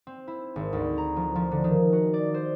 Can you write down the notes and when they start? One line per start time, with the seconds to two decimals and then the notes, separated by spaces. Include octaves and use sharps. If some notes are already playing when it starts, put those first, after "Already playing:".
0.07 C4
0.28 E4
0.56 G#1
0.73 D2
0.98 A#5
1.16 F3
1.36 F3
1.51 D3
1.64 D#3
1.93 F#4
2.14 D5
2.34 C5